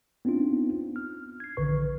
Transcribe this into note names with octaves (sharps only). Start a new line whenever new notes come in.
B3 C4 D4 D#4 F4
F6
G#6 C7
A#1 D3 D#3 B4 C#6